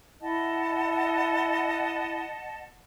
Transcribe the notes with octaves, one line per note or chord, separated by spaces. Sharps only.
E4 D#5 F#5 A5